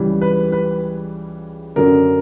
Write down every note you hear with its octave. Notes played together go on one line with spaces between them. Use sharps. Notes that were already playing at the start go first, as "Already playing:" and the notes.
Already playing: C#2 C#3 E3 G3
B4
B4
F#2 D3 F#3 A#4